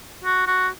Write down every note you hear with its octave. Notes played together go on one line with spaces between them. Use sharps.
F#4
F#4